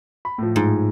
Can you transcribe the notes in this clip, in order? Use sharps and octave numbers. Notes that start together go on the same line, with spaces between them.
B5
A2 F3
G#2